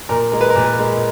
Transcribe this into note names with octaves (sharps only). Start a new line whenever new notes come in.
A#2 A#4
G#3 A#4
B4
A#4
A#2
G#3